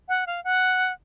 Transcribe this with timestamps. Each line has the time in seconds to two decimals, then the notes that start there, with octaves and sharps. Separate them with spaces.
0.09 F#5
0.27 F5
0.44 F#5